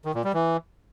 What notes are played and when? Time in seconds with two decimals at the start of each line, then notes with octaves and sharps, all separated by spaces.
0.05 D#3
0.15 A#2
0.24 G3
0.34 E3